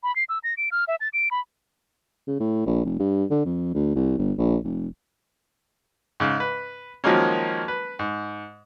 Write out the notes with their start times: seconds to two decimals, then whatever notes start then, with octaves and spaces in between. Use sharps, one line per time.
0.03 B5
0.16 C7
0.29 E6
0.44 A#6
0.57 D7
0.72 F6
0.88 E5
1.01 A6
1.13 D7
1.31 B5
2.27 C#3
2.40 A2
2.66 A#1
2.85 F1
2.99 G2
3.31 D3
3.45 F2
3.74 D2
3.95 C2
4.18 G1
4.38 A#1
4.64 F1
6.20 G#2 C#3
6.40 B4
7.04 D#3 F3 F#3 G#3 A#3 C#4
7.68 B4
7.99 G#2